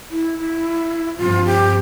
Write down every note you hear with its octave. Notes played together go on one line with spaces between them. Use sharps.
E4
E4
G2 F3 C4 F4
G4